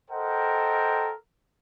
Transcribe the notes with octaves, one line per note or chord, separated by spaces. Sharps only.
A4 A#4 C5 D#5 F#5 G5